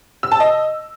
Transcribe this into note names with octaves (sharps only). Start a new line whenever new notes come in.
E6
A5
D#5